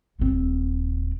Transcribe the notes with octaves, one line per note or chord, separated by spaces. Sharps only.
D#1 C4